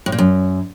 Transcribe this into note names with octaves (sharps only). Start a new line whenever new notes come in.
A2
A#2
F#2